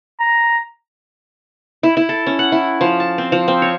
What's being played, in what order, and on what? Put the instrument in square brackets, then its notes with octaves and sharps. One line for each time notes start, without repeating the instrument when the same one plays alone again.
[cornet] A#5
[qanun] E4
E4
A4
C#4
F#5
E4
F3
A5
C4
F3
C4
C#5